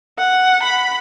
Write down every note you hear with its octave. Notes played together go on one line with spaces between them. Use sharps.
F#5
B5